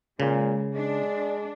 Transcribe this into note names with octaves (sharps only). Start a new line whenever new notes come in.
A#2 C#3 G#3
G#3 D4